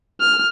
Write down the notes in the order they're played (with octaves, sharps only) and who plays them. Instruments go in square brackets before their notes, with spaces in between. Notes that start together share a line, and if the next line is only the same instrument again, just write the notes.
[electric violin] F6